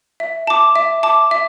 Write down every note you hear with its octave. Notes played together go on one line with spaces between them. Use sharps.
E5
A5 D6
E5
A5 D6
E5